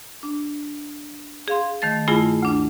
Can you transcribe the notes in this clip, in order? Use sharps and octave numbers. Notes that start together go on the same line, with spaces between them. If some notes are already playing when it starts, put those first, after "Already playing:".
D4
G#4 F5 C6
D#3 A3 A6
G2 A3 E4 F4 G#4 G#5
D2 D4